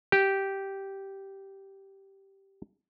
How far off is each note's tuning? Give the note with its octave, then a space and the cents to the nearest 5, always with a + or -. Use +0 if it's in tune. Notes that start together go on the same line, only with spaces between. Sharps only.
G4 -10